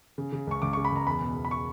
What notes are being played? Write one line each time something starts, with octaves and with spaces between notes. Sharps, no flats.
C#3
C#3
C#2 C#6
C#2 D6
C#3 C#6
B5
C#2 A#5
E2 B5
B2
E2
B5
C#6